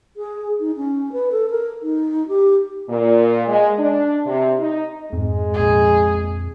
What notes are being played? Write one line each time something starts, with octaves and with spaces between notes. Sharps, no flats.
G#4
D#4
C#4
B4
A4
A#4
D#4
G4
A#2
G#3
D4
C3
D#4
F2 G#2 G#3
A#1 G#4